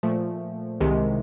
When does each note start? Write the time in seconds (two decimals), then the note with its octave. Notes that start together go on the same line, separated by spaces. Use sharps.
0.03 A#2 F3 A3
0.81 C2 C3 D#3 G#3